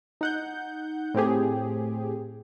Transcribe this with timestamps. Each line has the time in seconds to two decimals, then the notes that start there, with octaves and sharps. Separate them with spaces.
0.21 D#4 F#5 G6
1.14 A2 C4 G4 G#4